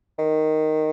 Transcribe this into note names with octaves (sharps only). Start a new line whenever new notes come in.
D#3